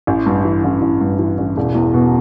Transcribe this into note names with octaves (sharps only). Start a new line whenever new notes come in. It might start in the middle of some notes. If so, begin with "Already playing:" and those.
A1
G2
E3
A1
A1
G2
E3
A1
E1
E2
B2